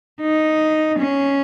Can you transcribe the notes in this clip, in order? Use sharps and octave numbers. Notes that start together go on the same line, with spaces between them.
D#4
C#4